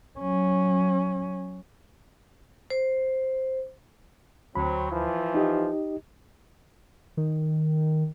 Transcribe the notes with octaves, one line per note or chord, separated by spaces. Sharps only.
F#3 C#4
C5
D2 F#3 C4 B5
E3 F3
D#4 G4 D#5
D#3